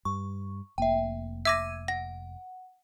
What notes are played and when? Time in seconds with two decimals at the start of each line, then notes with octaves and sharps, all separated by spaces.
0.05 G2 C#6
0.78 F1 A#3 E5 G5
1.45 E5 D6 E6 G#6 A#6 D#7
1.88 F#5 A#6